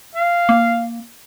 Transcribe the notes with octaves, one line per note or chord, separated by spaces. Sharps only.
F5
A#3